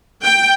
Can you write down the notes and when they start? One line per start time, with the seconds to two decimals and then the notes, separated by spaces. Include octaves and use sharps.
0.24 G5